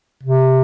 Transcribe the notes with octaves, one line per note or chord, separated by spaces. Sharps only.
C3